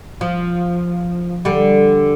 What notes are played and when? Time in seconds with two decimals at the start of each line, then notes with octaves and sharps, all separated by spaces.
0.21 F3
1.45 D3 G3